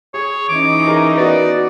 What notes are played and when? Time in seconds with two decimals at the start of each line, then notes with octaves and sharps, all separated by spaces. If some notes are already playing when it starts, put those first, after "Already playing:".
0.14 G#4 C#5
0.49 E3 C#4 D#4 D6
0.87 G#4 A#4
1.17 B3 F#4 D5